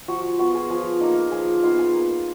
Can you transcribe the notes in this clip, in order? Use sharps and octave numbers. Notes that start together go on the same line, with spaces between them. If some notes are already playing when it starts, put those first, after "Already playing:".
F3 F#4
B3 F4 F#4
G#4
F3 G#4
A#3 D#4
F3 G#4
B3 D#4 F4
G#4
A#3